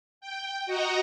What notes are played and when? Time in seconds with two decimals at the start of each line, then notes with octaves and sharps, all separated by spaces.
0.21 G5
0.66 F#4 D#5 F#5 A#5